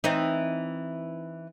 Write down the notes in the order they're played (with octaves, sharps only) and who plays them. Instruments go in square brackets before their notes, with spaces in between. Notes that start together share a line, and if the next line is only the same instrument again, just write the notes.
[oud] E3 C4 D#4